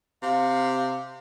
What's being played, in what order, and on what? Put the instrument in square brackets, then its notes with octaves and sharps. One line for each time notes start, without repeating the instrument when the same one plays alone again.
[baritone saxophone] C3 [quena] F5